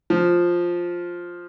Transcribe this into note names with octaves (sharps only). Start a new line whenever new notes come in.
F3